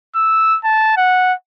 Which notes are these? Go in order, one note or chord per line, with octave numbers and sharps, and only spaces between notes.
E6
A5
F#5